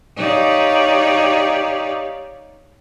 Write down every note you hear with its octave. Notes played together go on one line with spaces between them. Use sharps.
D#4 G4 C#5 D5 F5